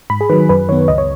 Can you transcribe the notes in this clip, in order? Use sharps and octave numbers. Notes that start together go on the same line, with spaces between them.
G#2 B5
G#4
D#3 F#3 B4
F#2 B4
D#3 B3 C#5
C#2 D#5
C#5